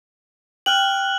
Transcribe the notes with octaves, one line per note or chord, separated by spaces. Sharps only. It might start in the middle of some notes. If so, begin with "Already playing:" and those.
G5 F6 F#6 F#7